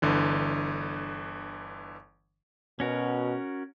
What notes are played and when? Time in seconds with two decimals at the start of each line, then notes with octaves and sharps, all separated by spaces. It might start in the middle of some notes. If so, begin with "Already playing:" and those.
0.02 G1 D3 E3
2.80 B2 C#4 F#4 A#4